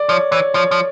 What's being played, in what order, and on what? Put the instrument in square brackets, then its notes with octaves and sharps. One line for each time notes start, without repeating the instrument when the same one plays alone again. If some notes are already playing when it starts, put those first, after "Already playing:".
Already playing: [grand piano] D5
[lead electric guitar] F3 [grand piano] C#5
[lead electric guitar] E3 [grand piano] C#5
[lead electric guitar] F3 [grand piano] C#5
[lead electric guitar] F3